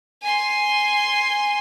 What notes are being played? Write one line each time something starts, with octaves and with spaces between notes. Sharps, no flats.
G#5 C6